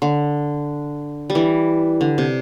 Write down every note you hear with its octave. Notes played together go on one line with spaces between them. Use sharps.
D3
G3
E3
D3
C3